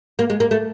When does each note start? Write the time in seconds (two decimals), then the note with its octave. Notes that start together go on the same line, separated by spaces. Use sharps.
0.19 A#3
0.30 G#3
0.40 A#3
0.51 A3